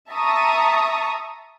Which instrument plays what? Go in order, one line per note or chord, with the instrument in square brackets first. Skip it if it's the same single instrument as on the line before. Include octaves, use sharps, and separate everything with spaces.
[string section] E5 A5 A#5 C#6 D#6